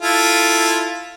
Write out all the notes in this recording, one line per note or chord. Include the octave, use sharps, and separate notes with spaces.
E4 F4 A4